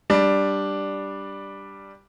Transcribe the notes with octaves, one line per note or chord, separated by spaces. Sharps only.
G3 D4